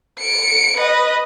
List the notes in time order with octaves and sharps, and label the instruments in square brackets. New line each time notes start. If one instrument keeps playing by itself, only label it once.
[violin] C#7 D7
B4 D#5